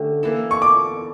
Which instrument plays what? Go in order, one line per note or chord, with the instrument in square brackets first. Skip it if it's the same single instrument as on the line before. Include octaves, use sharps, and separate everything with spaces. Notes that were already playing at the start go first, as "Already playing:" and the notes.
Already playing: [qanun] D3 A3 C#4 G4
E3 A#3 E4 A4
[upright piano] C#6
D6